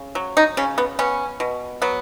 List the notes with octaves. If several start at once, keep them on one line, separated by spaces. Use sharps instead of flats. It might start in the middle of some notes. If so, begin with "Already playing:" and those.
Already playing: C#3
F#3
D#4
C#3 C#4
B3
B3 C#4
B2
F#3 B3